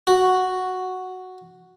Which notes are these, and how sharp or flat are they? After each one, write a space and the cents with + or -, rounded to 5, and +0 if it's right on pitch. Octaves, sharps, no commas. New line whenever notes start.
F#4 +0